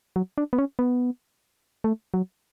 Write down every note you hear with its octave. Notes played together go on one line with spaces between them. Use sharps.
F#3
D4
B3
C#4
B3
A3
F#3